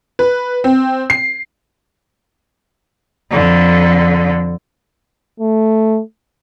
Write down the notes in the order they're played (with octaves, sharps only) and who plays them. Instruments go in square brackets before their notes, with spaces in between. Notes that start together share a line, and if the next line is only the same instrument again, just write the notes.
[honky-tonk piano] B4
C4
C7
[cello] F2 D3
[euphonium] A3